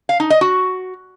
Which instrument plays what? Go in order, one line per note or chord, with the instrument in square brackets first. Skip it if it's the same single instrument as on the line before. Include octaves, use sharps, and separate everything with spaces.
[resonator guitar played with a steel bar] F5
D#4
D#5
F#4